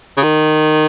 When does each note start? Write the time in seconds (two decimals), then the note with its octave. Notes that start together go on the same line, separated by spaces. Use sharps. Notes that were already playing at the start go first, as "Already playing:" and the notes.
0.17 C#3
0.23 D#3